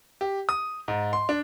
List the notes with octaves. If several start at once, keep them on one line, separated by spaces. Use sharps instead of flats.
G4
D#6
G#2
C6
D4